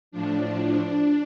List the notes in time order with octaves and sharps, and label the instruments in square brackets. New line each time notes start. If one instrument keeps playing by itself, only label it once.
[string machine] A2 F3 D4